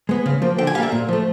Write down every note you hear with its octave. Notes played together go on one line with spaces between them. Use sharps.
G#3 B3
C#3
F3 A#3
D3 G5
G#5
G3 A#3 F5
E5
A#2
F3 A3